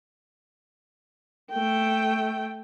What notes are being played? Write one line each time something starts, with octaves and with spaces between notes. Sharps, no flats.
A3 G5